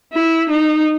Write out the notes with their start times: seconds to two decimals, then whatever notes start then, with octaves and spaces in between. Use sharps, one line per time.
0.13 E4
0.49 D#4